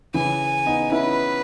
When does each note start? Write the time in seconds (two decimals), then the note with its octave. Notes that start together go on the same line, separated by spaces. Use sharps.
0.14 C#3 E3 G#5
0.66 B3 D#4
0.91 C#4 E4 B4